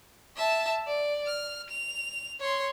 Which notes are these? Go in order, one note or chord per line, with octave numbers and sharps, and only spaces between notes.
E5 A5
D5
F6
F7
C#5 C6